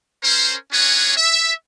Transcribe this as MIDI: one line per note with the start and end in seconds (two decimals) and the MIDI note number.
0.24 0.54 61
0.24 0.54 70
0.24 0.54 72
0.72 1.14 61
0.72 1.14 62
0.72 1.14 66
0.72 1.14 68
0.72 1.14 71
0.72 1.14 73
1.17 1.52 76